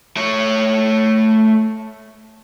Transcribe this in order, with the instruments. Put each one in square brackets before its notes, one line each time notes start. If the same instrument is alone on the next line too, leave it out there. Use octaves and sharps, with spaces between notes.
[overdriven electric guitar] A3 C#5